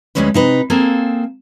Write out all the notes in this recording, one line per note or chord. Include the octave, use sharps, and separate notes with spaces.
D2 C#3 G3 G#3 C#4 B4
C3 D#4 B4
A#3 C4 G#4 A4